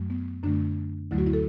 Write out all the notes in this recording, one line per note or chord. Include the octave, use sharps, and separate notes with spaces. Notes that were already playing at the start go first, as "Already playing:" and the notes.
Already playing: F#2 F#3 A3
B3
F#2 D3 A3 D4
D2 D3 F#3 A3 E4
F#4
E4
A4